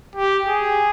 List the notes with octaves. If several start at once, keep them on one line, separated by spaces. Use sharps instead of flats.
G4
G#4